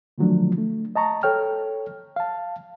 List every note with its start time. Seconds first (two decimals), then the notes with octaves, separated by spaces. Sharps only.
0.18 D3 D#3 F3 F#3 A3 D4
0.58 A3
0.96 D#5 A5 A#5 C#6
1.23 A4 C#5 G5 F6
2.16 F5 A5